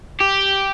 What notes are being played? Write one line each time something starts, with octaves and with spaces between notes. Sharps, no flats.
G4